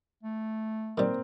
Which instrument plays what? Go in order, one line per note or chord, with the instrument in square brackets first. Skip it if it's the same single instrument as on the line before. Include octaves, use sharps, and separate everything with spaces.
[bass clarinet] A3
[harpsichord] D#3 G3 [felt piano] A#3 C4